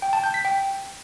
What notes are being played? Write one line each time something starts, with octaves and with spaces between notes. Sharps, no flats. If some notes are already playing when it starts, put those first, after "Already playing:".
G5
A5
G6
B6
G5